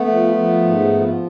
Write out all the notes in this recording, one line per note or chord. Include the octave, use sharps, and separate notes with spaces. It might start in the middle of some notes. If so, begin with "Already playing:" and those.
Already playing: A3 B3
F3
F3
G#2
F3